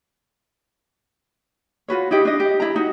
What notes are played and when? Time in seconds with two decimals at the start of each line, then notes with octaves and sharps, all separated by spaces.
1.88 F4 F#4 B4 C#5
2.11 D#4 E4 G4 D#5
2.25 D4 D#5
2.40 G4
2.60 E4 A#5
2.76 D#4 F#4 D#5